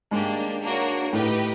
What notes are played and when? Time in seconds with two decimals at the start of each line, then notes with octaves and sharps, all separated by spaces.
0.11 G#2 A#3 D4 G4
0.62 A#3 D4 F#4 A#4 C#5
1.13 A2 D#4 G4 B4 D#5